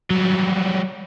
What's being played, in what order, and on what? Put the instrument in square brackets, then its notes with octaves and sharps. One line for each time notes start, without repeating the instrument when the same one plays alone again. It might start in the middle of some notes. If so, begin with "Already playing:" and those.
[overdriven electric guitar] F#3 G3